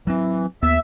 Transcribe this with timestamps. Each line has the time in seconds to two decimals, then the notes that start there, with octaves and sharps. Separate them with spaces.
0.07 E3 F#3 C4
0.63 D#2 B3 E5 E6